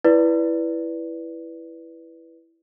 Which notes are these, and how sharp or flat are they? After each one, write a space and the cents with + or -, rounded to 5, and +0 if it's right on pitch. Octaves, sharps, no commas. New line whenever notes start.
E4 +5 B4 -5 D5 -10